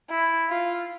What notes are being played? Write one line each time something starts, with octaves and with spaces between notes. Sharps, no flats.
E4
F4